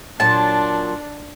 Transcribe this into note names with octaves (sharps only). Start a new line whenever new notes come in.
A#2 F#3 D4 A5